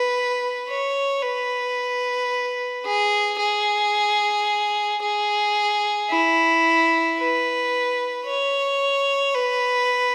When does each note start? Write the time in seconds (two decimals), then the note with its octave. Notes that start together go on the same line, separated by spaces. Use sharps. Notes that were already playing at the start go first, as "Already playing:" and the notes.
Already playing: B4
0.69 C#5
1.23 B4
2.85 G#4
3.39 G#4
5.02 G#4
6.10 E4
7.18 B4
8.26 C#5
9.35 B4